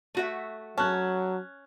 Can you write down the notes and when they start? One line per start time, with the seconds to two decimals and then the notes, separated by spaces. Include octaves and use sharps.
0.15 A3 F#4 E5
0.78 F#3 C#4 A5 F#6